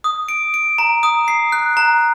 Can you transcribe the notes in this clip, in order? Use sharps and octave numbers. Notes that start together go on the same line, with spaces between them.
D#6
D7
D7
A#5
D#6
C7
F#6
A#5